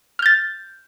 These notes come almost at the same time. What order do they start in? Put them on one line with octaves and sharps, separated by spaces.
F6 G6 A6